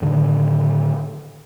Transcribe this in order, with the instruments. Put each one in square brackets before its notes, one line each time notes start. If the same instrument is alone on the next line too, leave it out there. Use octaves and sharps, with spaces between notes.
[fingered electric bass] A2 D3 D#3